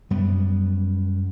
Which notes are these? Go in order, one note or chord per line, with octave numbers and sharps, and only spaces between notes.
F#2 G3 B3